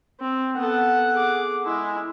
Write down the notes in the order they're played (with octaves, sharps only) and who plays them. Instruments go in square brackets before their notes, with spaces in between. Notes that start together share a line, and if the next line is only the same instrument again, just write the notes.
[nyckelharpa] C4
[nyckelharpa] B3 A4 [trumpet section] F#5
[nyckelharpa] G#4 D6
[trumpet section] G#3 [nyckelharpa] E4